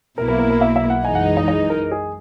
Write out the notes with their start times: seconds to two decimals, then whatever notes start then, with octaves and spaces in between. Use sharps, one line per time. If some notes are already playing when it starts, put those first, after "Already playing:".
0.18 B1 B2 A#3 E4 A#4
0.28 A#4
0.39 A#4
0.50 A#4
0.61 E5
0.76 E5
0.90 F#5
1.05 F#2 E3 G#3 D#4 G#5
1.15 F#5
1.37 D#5
1.48 D#5
1.70 A#4
1.91 G#4